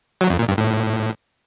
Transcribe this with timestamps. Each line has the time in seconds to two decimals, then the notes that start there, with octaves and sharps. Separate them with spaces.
0.21 F#3
0.30 F2
0.39 A#2
0.48 G2
0.57 A2